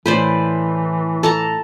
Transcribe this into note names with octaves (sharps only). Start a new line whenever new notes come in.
A2 E3 C#4 B4 C5 D5
A4 A5 A#5